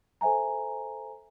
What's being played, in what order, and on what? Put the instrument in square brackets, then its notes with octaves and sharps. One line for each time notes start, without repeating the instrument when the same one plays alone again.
[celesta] A4 C5 E5 G#5 A#5